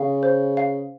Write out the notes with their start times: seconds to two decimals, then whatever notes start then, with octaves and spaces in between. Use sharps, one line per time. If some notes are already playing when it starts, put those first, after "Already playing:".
Already playing: C#3 F5
0.23 C5
0.57 F5